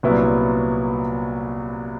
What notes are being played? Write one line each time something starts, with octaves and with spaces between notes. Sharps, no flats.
C2 A#2 F#3 B3 E4